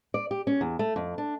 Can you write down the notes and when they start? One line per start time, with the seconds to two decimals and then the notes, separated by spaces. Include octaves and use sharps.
0.14 D5
0.31 G4
0.47 C#4
0.61 E2
0.79 A3
0.96 F2
1.18 D4